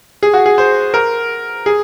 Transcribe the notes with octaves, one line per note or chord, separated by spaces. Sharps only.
G#4
F#4
G#4
C5
A#4
G#4